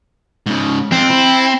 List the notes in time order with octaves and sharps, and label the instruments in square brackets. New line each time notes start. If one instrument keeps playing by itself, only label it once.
[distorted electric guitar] G#2 C#3
[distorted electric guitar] F2 [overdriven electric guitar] C4
[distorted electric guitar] E4